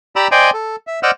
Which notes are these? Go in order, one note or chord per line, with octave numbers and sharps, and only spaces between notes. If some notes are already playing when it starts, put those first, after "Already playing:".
G4 D5 A#5 B5 E6
C5 D5 D#5 G5 G#5 C6
A4
E5
C5 D5 D#5 F#5 E6 F6